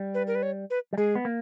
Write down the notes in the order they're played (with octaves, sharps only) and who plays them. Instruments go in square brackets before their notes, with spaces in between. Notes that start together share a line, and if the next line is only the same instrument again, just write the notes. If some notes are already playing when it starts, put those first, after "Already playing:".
Already playing: [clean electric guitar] G3
[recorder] B4
A#4
B4
C#5
B4
[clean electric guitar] G3
[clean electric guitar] G#3 [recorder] G#4
[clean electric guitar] B3
A#3